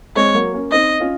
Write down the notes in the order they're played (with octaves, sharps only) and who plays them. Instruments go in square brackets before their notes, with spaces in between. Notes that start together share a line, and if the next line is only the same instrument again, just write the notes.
[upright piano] G#3 C4 [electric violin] C#5
[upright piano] F#3 A#3
A#3 C#4
[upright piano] C4 D#4 [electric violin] D#5
[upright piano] C#4 F4